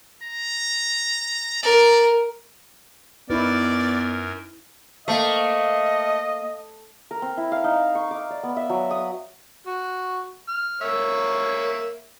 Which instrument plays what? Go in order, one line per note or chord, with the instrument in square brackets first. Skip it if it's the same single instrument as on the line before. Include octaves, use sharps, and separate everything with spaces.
[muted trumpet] A#5
[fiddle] A#4 [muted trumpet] D5
[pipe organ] F#2 A#4 [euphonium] B3 [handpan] D#4 E4 B4 [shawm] D5
[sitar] A3 [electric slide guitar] A#3 C5 [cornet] D#5 [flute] F5
[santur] A#4
C4
E4
F5
D#4
C#6
D6
D5
B3
E5
F#3
D#6
[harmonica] F#4
F6
A#3 C#5 E5